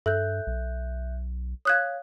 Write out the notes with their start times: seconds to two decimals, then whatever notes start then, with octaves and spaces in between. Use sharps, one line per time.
0.06 G2 A4 E5 F#6 G6
0.47 B1
1.65 C#5 F5 D#6 F#6 G#6